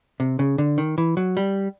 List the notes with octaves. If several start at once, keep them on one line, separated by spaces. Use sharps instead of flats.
C3
C#3
D3
D#3
E3
F#3
G3